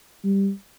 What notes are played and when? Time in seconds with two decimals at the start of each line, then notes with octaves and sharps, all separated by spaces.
0.24 G3